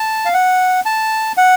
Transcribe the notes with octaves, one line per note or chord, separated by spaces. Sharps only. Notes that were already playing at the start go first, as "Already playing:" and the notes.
Already playing: A5
F5
F#5
A5
F#5